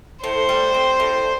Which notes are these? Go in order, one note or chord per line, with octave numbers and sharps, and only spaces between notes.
A2 C5
G3
C4
A2